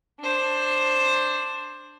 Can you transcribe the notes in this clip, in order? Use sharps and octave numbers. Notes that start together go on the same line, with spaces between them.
D4 C5